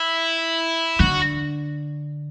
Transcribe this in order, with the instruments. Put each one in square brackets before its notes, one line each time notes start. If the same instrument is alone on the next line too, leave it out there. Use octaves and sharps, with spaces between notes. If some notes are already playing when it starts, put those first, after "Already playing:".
Already playing: [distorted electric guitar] E4
[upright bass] D3 [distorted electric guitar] F#4